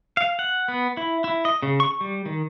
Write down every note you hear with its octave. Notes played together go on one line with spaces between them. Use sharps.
F5
F#5
B3
E4
E4
D#5
C#3
C#6
G3
D#3